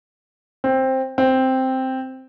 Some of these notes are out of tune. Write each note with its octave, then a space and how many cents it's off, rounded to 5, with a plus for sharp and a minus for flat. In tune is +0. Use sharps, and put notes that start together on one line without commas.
C4 +10
C4 +0